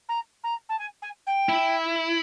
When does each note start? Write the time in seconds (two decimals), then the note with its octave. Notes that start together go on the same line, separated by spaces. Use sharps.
0.08 A#5
0.43 A#5
0.69 A5
0.78 G#5
1.02 G#5
1.26 G5
1.49 E4